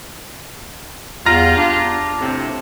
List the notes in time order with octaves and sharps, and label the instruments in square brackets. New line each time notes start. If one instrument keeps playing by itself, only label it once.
[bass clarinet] E2 [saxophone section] G3 F4 [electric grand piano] A#5 F6 A#6
[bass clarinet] D4
[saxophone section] A2 C3 C4